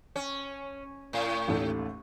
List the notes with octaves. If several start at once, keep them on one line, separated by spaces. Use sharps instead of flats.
C#4
A2
A1 D#2 A3